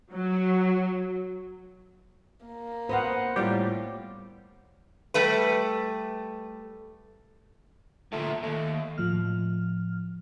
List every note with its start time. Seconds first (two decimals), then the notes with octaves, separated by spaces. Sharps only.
0.13 F#3
2.45 A#3
2.89 B3 C5 D#5 F5 F#5
3.36 A2 G3 F4 G4
5.14 G3 A3 B4
8.12 D2 A#2 A3
8.43 D#2 A3
8.98 A2 F3 F6